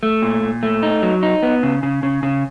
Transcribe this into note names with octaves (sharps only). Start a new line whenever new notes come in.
A3
A#2
A#2
A3
D#4
F#3
D#4
B3
C#3
C#3
C#3
C#3